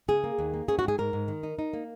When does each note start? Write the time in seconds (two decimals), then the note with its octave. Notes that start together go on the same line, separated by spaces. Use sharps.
0.08 C#3 G#4
0.24 A#3
0.39 D#2
0.54 A#3
0.68 C#4 G#4
0.79 F#4
0.83 G#2
0.88 G#4
0.98 G#2 A#4
1.13 G#2
1.28 D#3
1.43 D#4
1.59 D#4
1.73 A#3